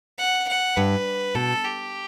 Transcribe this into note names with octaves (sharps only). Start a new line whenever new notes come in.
F#5
F#5
G2 B4
B2 A4
G4